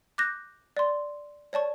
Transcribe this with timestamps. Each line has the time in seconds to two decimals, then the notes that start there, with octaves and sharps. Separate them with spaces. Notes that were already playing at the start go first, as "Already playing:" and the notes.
0.18 D6 F#6 G6 A#6
0.77 D5 C6
1.53 C#5 D5 A5 C#6